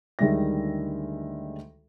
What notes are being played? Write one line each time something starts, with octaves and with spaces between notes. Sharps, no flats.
D2 D#3 G3 G#3 E5 A#6